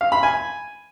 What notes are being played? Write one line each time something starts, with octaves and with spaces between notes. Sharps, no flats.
F5
B5
G#5